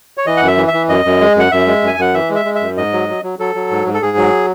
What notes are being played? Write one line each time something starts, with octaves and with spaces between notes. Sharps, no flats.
C#5
E3 D#5
F#5
F#2
E5
E3
E5
E3
F#2 D#5
F#2
G#3
F#2 F#5
F#2 E5
G#3
F#2 G#5
F#2 F#5
E3 E5
G#3
E5
G#3
E5
F#2
G#2 D#5
F#3
F#3
F#3
F#3 A4
F#3
G#2
G#2
A4
G#2 G#4
F#3